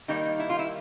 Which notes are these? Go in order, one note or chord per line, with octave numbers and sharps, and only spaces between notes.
D#3 G3 A#3 D#4
E4
F4
E4